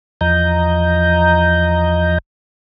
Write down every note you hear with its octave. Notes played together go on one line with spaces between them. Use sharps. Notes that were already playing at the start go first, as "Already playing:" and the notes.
E2 F3 D#5 A#5 G6